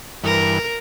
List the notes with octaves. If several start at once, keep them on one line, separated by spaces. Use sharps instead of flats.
G2 E3 A#4